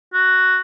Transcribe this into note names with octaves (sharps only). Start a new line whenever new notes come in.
F#4